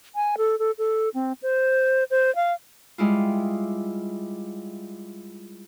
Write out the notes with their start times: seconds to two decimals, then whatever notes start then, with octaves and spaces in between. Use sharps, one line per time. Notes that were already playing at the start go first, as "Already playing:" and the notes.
0.15 G#5
0.37 A4
0.59 A4
0.78 A4
1.14 C4
1.43 C5
2.11 C5
2.35 F5
2.98 G3 G#3 E4 F4